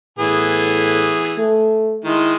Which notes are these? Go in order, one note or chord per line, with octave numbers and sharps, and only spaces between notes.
A2 E3 B3 G#4
A3
D#3 G#3 E4